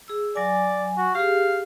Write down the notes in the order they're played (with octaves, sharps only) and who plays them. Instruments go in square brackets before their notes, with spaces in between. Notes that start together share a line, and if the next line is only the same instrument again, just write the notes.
[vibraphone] G#4 E6
[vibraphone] F#3 G#5 [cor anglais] D5
[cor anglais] F#4
[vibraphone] G4 G#4 [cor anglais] F5